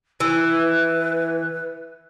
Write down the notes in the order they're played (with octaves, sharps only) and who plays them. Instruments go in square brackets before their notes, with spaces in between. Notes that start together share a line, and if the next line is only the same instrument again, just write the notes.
[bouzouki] E3 [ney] B4